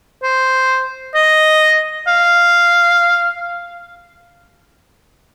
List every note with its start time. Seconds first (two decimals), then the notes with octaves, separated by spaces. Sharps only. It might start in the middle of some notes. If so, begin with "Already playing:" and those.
0.23 C5
1.15 D#5
2.07 F5